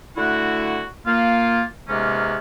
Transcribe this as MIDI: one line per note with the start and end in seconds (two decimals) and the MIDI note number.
0.16 0.83 50
0.16 0.83 57
0.16 0.83 64
0.16 0.83 66
1.06 1.62 58
1.06 1.62 65
1.89 2.38 44
1.89 2.38 48
1.89 2.38 56
1.89 2.38 58
1.89 2.38 59
1.89 2.38 61